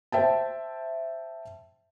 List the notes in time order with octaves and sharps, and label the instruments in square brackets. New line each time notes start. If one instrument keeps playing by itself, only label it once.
[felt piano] C5 E5 G5 A5